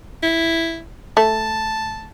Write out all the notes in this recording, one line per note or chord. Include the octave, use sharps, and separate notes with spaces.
E4
A3 A5